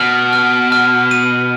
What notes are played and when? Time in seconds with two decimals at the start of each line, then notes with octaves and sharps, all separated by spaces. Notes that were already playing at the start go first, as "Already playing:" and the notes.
Already playing: B2 F6
0.33 F6
0.72 F6
1.11 D#7